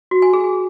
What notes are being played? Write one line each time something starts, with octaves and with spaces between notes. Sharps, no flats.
F#4
G#5
G#4